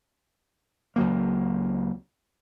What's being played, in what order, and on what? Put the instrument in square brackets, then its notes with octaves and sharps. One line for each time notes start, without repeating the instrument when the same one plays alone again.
[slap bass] C#2 F#3 A#3